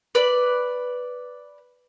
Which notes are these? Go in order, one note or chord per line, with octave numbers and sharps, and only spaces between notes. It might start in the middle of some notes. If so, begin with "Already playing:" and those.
B4 D5